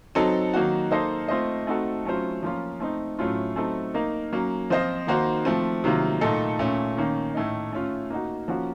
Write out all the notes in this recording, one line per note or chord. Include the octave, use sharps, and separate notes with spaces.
F#3 C4 D#4 A4
D#3 F#3 A#3 D#4 F#4
A#3 D#4 A4 C5 D#5
A3 C4 F4 C5 D#5
A3 C4 D#4 F#4 A4
F#3 A3 C#4 F4 C5
F3 A#3 C#4 F4
A3 C4 D#4
A2 F#3 A3 C#4 F4
F#3 A3 C4 D#4 A4
A#3 D#4 A#4
F#3 A#3 C#4
F3 C4 F4 C5 D#5
D#3 A#3 D#4 F#4 C5
F3 A3 C4
C3 D#3 F#3 A#3 F4
A#2 A3 D#4 A4
A#2 A3 C#4
D#3 A#3 C#4
A2 A3 D#4
A3 C#4 F4
A#3 D#4 F#4
F3 A#3 C#4 F#4